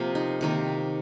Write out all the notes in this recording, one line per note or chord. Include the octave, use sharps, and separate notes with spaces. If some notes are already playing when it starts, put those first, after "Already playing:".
Already playing: C3 F3 A#3
D#4
C3 D#3 A#3